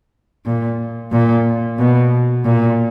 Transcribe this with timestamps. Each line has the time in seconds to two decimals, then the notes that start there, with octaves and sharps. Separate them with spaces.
0.46 A#2
1.12 A#2
1.78 B2
2.45 A#2